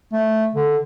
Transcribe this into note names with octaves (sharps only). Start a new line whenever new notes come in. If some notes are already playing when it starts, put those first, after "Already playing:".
A3
D3